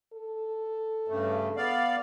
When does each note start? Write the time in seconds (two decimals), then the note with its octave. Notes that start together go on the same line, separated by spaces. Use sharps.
0.13 A4
1.08 G2 C#3 A3
1.56 B3 D5 F5